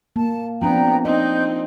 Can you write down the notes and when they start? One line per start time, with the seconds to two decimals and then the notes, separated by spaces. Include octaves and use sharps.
0.16 A#3 A5
0.62 F3 B3 C4 D4 G5 A#5
1.05 C4 D#4 D#5 G6